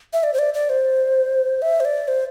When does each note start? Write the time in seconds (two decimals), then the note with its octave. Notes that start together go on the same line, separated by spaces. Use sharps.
0.13 E5
0.23 D5
0.34 C5
0.39 D5
0.54 D5
0.69 C5
1.62 E5
1.80 C5
1.85 D5
2.08 C5